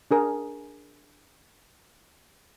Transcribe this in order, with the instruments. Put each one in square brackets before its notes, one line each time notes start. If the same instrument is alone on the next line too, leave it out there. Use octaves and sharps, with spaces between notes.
[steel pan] D4 G#4 A#4